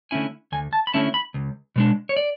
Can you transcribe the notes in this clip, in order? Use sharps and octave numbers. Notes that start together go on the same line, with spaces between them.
D3 A3 C#4 E4 G#5
D2 G#5
A5
B5
D3 A3 C#4 E4 A5
B5
C#2
B2 G#3 D4
C#5
D5